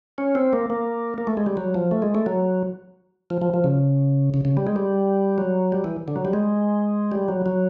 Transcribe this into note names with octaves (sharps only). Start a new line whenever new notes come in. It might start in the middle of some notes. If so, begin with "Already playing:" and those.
C#4
C4
A#3
A#3
A#3
A3
G#3
G3
F#3
F3
A3
G#3
A3
F#3
F3
F3
F3
C#3
C#3
C#3
G3
G#3
G3
F#3
G3
E3
D3
F#3
G3
G#3
G3
F#3
F#3